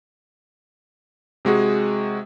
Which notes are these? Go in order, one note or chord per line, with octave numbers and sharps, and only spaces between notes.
C3 G#3 F#4 G#4